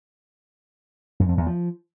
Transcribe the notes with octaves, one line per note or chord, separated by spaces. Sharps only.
F#2
F2
E2
F3